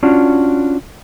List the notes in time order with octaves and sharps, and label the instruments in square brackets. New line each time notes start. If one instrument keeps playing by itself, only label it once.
[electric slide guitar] C#4 D4 F4 F#4